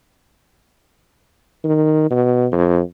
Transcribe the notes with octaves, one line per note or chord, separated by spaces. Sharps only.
D#3
B2
F2